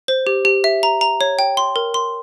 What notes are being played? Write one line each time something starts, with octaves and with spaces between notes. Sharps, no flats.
C5
G4
G4
E5
A#5
A#5
C#5
G5
C6
A#4
C6